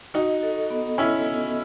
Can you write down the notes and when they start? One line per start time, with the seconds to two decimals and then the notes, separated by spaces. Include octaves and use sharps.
0.14 D#4 F#4 D#5
0.43 A4
0.70 B3
0.98 C#4 E4 D#5
1.26 B3